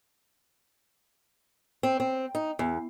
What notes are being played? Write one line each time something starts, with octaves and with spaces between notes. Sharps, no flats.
C4
C4
D#4
E2